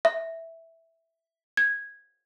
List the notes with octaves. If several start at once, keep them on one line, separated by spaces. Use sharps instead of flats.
E5
G#6